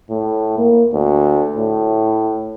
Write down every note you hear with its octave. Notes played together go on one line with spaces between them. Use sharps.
A2
A#3
D2
A2